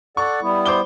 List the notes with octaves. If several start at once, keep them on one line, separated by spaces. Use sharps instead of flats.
A4 D5 F#5 C#6
G3 B3 E4
C5 D6 G7